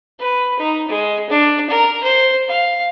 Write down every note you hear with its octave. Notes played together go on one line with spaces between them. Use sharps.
B4
D#4
G#3
D4
A#4
C5
F5